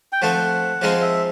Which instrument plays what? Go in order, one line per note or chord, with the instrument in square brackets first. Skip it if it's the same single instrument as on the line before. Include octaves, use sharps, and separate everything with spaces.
[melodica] G5
[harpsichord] F3 A3 C4 [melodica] F#5
[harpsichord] F3 G#3 C4 D#4 [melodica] F5
[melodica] E5